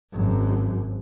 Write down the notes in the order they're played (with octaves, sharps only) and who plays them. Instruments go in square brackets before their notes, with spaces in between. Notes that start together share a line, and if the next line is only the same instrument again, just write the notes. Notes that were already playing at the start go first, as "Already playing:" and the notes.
[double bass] G#1 F#2